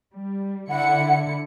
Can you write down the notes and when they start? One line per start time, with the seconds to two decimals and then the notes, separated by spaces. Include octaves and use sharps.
0.14 G3
0.70 D3 E4 F#5 C#7